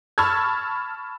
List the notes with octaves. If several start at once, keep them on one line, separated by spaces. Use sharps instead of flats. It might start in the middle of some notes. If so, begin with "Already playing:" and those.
A5 B5 C#6 E6 F6 G#6